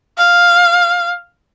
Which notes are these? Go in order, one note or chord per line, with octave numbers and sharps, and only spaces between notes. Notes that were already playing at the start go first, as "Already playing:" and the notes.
F5